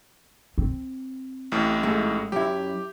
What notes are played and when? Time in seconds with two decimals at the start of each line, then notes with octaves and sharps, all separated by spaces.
0.58 C4
1.52 A1 A2
1.83 G#2 G#3 A3
2.32 F#2 E4 G4